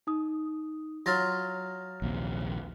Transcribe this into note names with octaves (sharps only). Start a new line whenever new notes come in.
D#4 D#6
F#3 F4 F6 A6 A#6
A#1 D#2 C3